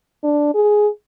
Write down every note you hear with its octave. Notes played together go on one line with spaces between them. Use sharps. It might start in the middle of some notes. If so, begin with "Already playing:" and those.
D4
G#4